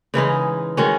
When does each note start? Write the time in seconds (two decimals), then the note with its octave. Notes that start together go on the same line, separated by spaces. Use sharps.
0.14 C#3 E3 G#3 D#4
0.77 D#3 G#3 C#4 F#4